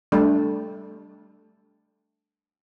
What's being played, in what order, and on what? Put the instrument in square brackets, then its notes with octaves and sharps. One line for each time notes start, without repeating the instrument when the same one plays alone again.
[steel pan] G3 A3 D4